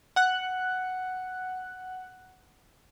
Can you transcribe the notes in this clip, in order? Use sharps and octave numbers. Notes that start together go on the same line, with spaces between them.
F#5 F#6